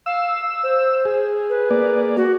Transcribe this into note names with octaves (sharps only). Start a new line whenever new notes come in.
F5 E6
C5
G#4
B4
A#3 G#4 D5
F#4